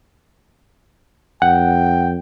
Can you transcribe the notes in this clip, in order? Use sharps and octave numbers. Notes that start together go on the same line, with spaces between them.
F2 F#5 G5